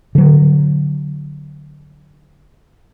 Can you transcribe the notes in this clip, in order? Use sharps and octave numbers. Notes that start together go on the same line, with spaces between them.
D3 F#3